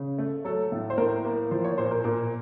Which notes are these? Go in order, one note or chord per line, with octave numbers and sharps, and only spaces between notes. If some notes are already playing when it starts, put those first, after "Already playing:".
Already playing: C#3
A3
F#3 A4
A2
C5
A2 A#4
A#3
F3 C5
C#5
A#2 C5
A#4
A#2 A#4